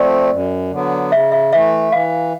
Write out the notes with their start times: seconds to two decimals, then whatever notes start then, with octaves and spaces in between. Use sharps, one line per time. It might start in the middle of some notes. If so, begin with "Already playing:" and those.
Already playing: F3 A3 C4 D5
0.31 F#2
0.71 D3 F#3 B3
1.12 C#3 E5
1.32 E5
1.52 E3 A3 E5
1.92 E3 F5